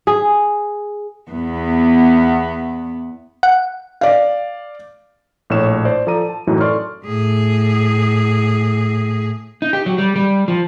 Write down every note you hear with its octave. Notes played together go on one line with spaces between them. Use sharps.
G#4
E2 B3
F#5
D5 F5
A#1 A2 C#5 C#6 E7
C5 D5
F3 A4 D5 A#5 D#7
A5
F#2 A2 E3 D#4 F#4
A4 D5 C6 C#6 F6
A2 G#4
D#4
G4
F#3
G3
G3
F3